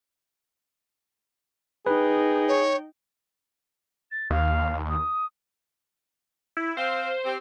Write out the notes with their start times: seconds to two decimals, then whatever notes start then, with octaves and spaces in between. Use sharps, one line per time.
1.86 D#4 G#4 B4 G5
2.48 C#5
4.11 A6
4.30 D#2 F5
4.89 D#6
6.57 E4
6.77 C4 C5 F5
7.25 C4 G4